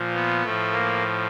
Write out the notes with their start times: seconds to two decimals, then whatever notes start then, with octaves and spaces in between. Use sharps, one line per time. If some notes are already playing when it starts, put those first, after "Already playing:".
Already playing: A#2 F3
0.14 B3
0.44 A2 F3 A3
0.72 A#3